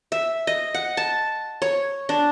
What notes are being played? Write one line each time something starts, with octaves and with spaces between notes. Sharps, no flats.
E5
D#5
F#5
A5
C#5
D4